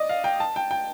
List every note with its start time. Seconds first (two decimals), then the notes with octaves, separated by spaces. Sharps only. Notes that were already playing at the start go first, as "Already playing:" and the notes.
Already playing: D5 D#5
0.09 F5
0.24 G5
0.40 A5
0.56 G5
0.71 G5